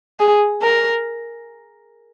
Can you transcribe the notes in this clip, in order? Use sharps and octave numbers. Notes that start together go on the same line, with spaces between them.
G#4
A#4